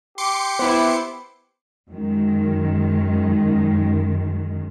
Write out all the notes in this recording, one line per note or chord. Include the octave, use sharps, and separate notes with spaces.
G4 C6 D6 C#7
B3 E4 C5 B5
F#2 D#3 G#3